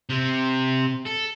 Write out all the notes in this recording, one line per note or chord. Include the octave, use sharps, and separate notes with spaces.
C3 C4
A4